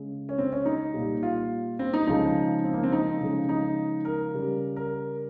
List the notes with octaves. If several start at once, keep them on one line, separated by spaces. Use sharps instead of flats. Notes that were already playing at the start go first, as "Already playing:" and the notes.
Already playing: C#3 G#3
C#4
C4
C#4
D#4
A#2 G3
F4
C4
D#4
C#3 F3 G#3 D#4
C4
A#3
C4
D#4
C#3 F3 G#3
D#4
A#4
C#3 G3
A#4